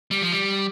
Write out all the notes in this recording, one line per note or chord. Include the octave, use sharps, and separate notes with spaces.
G3
F3
G3